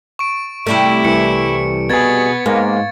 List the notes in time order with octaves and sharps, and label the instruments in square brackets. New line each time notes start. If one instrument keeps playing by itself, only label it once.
[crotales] C#6 D7
[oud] C3 G3 A3 [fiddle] E4
[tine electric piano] C2 E3 [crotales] C#7
[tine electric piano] B2 G#4 [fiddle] B3 [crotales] G#6 A6
[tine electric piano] G#2 G#3 [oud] A#3